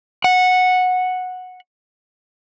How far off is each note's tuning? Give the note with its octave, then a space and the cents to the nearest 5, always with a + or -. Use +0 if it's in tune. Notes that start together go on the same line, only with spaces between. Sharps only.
F#5 -10